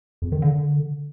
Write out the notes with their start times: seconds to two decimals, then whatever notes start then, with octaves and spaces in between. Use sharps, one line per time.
0.22 F2
0.32 D#3
0.42 D3